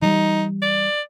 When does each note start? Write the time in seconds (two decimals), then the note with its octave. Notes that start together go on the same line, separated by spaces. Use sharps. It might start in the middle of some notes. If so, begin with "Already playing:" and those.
0.02 E3 G3 D#4
0.62 D5